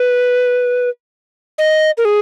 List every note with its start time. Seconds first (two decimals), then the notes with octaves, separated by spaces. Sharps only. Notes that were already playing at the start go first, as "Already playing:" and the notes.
Already playing: B4
1.58 D#5
1.98 A#4
2.05 G#4